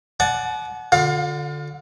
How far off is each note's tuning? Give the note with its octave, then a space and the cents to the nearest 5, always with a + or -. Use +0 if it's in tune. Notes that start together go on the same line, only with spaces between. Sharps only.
D5 +15 F#5 +0 A5 -45
D3 +0 F4 +40 F5 +30